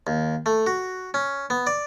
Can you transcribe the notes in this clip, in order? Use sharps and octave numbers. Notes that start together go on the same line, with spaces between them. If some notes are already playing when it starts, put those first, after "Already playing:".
D#2
A3
F#4
C#4
B3
D5